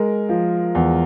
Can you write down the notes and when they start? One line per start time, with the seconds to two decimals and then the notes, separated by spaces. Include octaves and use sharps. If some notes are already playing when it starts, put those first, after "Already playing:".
Already playing: G#3 A#4
0.29 F3
0.75 E2